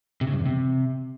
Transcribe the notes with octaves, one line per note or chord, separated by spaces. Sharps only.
C3
C#3
G2
E2
C3